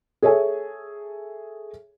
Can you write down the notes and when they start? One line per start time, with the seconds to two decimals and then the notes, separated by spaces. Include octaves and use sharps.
0.23 G#4 A4 C#5 E5 G#5